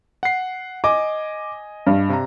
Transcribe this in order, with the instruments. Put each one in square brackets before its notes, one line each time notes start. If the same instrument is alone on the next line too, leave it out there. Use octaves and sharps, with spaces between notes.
[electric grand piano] F#5 C7
[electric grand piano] D#5 G#5 [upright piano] D6
[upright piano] G2
[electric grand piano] C3 A#5